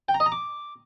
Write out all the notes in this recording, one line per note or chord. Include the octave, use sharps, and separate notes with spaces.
G5
A#5
D#5
A#5
D6